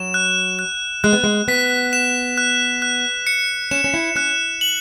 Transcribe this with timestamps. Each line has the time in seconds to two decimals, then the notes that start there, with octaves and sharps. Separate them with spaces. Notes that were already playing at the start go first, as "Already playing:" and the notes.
Already playing: F#3 E7
0.14 F#6
0.59 F#6
1.04 G#3 F#6
1.13 B3
1.24 G#3
1.48 B3 B6
1.93 E7
2.38 F#6
2.82 F#6
3.27 C#7
3.71 C#4 E7
3.84 C#4
3.94 E4
4.16 C#4 F#6
4.61 F#7